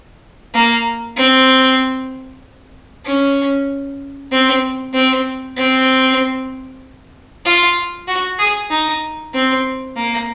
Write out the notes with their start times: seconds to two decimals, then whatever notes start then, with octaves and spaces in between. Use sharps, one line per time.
0.55 A#3
1.17 C4
3.05 C#4
4.32 C4
4.94 C4
5.57 C4
7.46 F4
8.08 F#4
8.39 G#4
8.71 D#4
9.34 C4
9.97 A#3